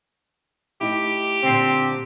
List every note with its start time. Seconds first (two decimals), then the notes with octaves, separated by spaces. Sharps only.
0.81 A3 D#4 E4 G4
1.43 A#2 D3 C4